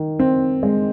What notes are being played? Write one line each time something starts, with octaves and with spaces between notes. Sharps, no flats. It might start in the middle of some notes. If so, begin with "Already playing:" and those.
Already playing: D#3
C4
G#3